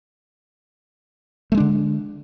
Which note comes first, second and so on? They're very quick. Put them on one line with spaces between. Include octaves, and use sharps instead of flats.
A3 G#3 D4 D3